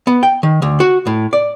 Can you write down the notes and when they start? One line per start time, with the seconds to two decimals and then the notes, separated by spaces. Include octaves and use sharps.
0.07 B3
0.23 G5
0.43 D#3
0.62 D2
0.80 F#4
1.07 A2
1.33 D5